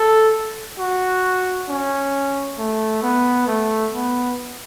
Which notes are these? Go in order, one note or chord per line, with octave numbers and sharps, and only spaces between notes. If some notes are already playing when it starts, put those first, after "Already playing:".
Already playing: A4
F#4
C#4
A3
B3
A3
B3